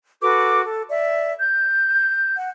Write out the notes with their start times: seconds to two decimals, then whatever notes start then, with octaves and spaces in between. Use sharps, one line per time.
0.22 F#4 A4 B4 D6
0.63 A4
0.89 D5 E5
1.39 G6
2.36 F#5